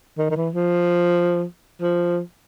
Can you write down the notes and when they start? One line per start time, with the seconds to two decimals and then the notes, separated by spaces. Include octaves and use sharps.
0.18 D#3
0.30 D#3
0.36 E3
0.54 F3
1.81 F3